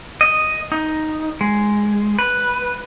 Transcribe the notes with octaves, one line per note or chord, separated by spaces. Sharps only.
D#5
D#4
G#3
B4